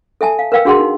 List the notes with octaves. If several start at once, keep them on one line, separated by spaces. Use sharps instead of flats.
A4 E5 G#5 A5
F5
A#4 B4 F5 G5 E6
D4 F#4 G#4 F#5 C6
D#4